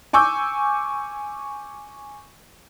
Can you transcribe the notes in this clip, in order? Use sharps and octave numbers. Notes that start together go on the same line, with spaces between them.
G#5 C#6 D6 E6 G6